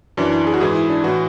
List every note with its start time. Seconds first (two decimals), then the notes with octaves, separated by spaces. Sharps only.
0.17 F#2 E3 D4
0.32 E4
0.47 G#4
0.54 F#4
0.60 G#2 E3 G#4
0.75 E4
0.89 D4
1.04 A2 E3 F#4